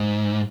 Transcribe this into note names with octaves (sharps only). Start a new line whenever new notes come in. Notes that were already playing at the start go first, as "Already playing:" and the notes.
Already playing: G#2